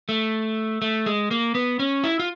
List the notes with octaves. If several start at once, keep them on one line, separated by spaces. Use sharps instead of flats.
A3
A3
G#3
A#3
B3
C#4
E4
F4